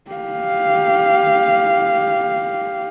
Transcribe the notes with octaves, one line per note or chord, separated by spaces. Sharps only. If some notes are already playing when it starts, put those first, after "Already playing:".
G4 F5